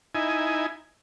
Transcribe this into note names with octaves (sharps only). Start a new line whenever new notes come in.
D#4 E4 G#5